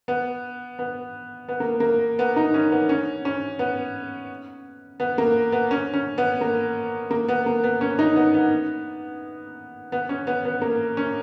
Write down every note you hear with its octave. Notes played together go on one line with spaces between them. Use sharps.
B3
B3
B3
A#3
A#3
B3
D#4
C#4
B3
C#4
C#4
B3
B3
A#3
B3
C#4
C#4
B3
A#3
A#3
B3
A#3
B3
C#4
D#4
B3
B3
B3
C#4
B3
B3
A#3
C#4